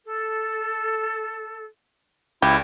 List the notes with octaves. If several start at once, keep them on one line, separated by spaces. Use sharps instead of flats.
A4
C#2 E4 G4 D5 G5